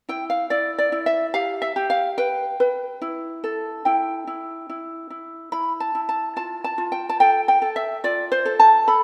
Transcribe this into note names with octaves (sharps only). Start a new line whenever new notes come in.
E4 G5
F5
E4 D5
D5
E4
E5
G4 F5
E5
G4
F5
B4 G5
B4
E4
A4
E4 G5
E4
E4
E4
E4 B5
A5
E4
A5
F4 A5
A5
F4
G5
A5
A4 G5
G5
A4
E5
F4 D5
C5
A4
A5
A4 B5